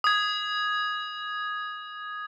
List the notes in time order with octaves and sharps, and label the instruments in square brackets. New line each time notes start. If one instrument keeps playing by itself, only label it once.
[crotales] D#6 G#6